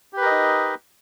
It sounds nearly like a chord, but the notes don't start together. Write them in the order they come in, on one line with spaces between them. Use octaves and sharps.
G4 B4 A#4 D#5 D#4